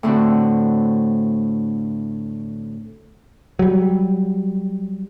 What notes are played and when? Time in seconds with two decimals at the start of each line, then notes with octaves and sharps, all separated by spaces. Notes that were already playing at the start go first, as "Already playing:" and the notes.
0.03 A2 D3 C4 F#4
3.59 F#3 G3